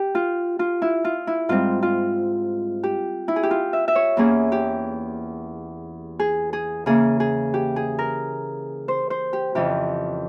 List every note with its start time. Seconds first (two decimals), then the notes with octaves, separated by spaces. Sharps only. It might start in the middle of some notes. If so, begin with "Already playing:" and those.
Already playing: G4
0.15 F4
0.59 F4
0.82 E4
1.05 F4
1.27 E4
1.49 G#2 G3 C4 F4
1.83 F4
2.83 G4
3.28 E4
3.36 G#4
3.43 G4
3.51 F4
3.73 E5
3.88 E5
3.95 C#5
4.17 E2 E3 A#3 C#4 G#4
4.52 G4
6.20 G#4
6.53 G#4
6.86 C#3 E3 A#3 C#4 G#4
7.20 G#4
7.54 G4
7.76 G#4
7.99 A#4
8.88 C5
9.10 C5
9.33 G4
9.55 F2 C#3 E3 G4